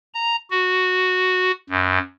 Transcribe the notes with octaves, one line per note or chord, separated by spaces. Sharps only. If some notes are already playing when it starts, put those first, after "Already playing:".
A#5
F#4
F#2